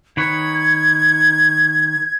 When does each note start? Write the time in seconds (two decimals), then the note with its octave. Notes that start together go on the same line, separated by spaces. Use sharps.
0.17 D#3 B4 C#5 G#6